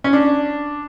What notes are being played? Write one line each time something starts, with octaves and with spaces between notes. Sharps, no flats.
C#4
D4